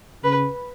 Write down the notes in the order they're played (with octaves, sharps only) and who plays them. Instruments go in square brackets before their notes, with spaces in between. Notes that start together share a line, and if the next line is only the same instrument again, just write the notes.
[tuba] C#3 [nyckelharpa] B4